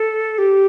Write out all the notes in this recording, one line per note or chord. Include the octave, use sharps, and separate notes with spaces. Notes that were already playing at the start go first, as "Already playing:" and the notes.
Already playing: A4
G4